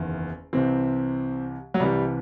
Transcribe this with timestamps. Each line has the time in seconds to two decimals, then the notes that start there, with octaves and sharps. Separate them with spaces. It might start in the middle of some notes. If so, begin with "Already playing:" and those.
Already playing: F#1 E2 D#3
0.53 C2 C3 E3 C4
1.74 F#3
1.80 C2 C3 E3 G3